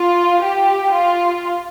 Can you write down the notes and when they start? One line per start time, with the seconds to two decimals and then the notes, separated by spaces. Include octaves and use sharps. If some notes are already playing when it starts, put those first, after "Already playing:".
Already playing: F4
0.42 G4
0.92 F4